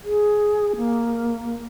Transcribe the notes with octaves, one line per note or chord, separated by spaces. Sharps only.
G#4
A#3